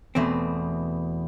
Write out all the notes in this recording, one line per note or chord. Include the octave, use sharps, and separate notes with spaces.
E2 B2 A3 C4